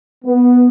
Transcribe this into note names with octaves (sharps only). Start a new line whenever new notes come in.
B3